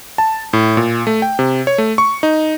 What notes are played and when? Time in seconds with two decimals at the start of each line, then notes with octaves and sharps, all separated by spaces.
0.18 A5
0.53 A2
0.77 A#2
1.07 A3
1.22 G5
1.39 C3
1.67 C#5
1.78 A3
1.98 C#6
2.23 D#4